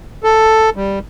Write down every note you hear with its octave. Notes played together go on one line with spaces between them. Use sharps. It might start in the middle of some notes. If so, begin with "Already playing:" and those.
A4
G3